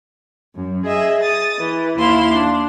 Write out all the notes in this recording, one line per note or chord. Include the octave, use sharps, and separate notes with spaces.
F#2
G#4 D#5 E5
D#6 A6
E3
D#2 E4 F5 C6
D4